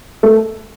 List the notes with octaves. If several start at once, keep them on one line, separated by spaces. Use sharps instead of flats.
A3